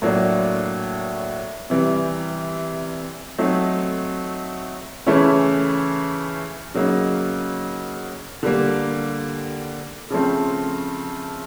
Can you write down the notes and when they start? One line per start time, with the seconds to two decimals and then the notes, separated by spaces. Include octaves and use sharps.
0.02 A2 F#3 A#3 D4
1.70 C3 E3 G3
3.38 F#3 A3 C4 D#4
5.06 C#3 E3 A3 C#4 E4
6.75 C#3 F#3 A#3 D#4
8.43 D3 G3 A#3
10.11 C#3 F3 A3 C4